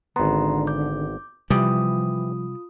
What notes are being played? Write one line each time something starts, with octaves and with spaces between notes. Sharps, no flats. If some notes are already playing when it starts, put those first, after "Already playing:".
G#1 D3 B3 A#5 C6
D6 G6
C3 E3 F3 G3 F4 G4 D#6